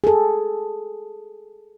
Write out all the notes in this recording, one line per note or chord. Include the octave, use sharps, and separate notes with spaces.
G#4 A4